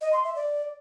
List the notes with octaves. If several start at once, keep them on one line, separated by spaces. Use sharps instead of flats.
D#5
C6
E5
D5